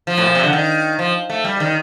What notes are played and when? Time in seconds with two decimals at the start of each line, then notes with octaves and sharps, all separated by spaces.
0.07 F3
0.18 A2
0.26 A#2
0.35 C3
0.43 D3
0.53 D#3
0.99 F3
1.30 A3
1.44 G3
1.60 D#3